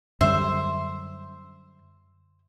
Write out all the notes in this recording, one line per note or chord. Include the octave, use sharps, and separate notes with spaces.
F#2 D3 G3 C5 E5